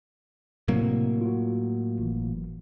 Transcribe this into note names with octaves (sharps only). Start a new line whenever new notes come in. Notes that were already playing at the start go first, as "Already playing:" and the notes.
A2 C3 F#3 A#3 C4
F4 F#4
G1 E3